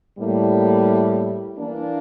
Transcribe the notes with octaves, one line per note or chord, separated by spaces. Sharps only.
A2 G3 A#3
E3 A#3 D4